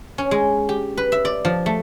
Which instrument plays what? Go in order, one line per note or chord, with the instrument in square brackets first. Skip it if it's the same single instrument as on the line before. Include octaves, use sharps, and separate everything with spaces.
[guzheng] C#4
G#3
G4
B4
E5
D5
F3
A3